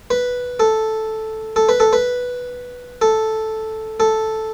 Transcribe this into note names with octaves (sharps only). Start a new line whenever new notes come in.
B4
A4
A4
B4
A4
B4
A4
A4